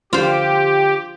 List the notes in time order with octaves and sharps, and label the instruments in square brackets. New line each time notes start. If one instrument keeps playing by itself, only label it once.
[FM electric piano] D3 F3 [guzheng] F4 C5 [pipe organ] G4